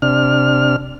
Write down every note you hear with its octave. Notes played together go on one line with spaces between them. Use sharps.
C3 D4 F6